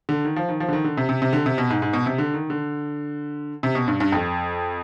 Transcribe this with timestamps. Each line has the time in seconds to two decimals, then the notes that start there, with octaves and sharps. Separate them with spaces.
0.09 D3
0.25 D#3
0.36 F3
0.49 D#3
0.60 F3
0.68 D3
0.73 D#3
0.84 D3
0.97 C3
1.09 C3
1.22 C3
1.33 D3
1.46 C3
1.58 B2
1.70 G#2
1.82 G#2
1.93 B2
2.06 C3
2.18 D3
2.34 D#3
2.50 D3
3.63 C3
3.75 B2
3.88 G2
4.00 G2
4.12 F2